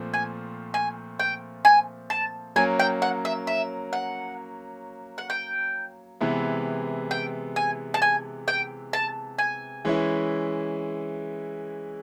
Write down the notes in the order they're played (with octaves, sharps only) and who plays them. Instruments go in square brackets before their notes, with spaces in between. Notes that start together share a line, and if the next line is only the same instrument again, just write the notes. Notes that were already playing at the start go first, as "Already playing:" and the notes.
Already playing: [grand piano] A#2 F3 A3 C4
[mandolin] G#5
G#5
G5
G#5
A5
[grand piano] F#3 A#3 C#4 [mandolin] G#5
[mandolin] G5
F#5
E5
E5
F#5
F#5
G5
[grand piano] C3 E3 G#3 B3 E4
[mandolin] G5
G#5
A5
G#5
G5
A5
G#5
[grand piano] E3 G#3 C#4 E4